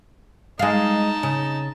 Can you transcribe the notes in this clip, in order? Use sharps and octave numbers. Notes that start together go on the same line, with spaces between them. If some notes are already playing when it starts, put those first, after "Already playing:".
G#3 D#4 F5 A5
C#3